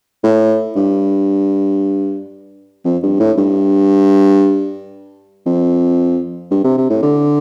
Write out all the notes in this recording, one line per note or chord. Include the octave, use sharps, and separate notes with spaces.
A2
G2
F2
G2
A2
G2
F2
G2
C3
C3
A2
D3